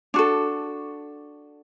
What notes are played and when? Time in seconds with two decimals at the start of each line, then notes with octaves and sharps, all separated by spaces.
0.14 D4 F#4 A4